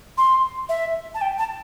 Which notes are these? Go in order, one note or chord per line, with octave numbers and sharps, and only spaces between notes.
C6
E5
A5
G5
A5